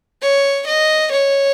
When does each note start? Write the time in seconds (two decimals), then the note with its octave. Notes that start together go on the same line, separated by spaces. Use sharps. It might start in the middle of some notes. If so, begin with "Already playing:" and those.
0.22 C#5
0.67 D#5
1.12 C#5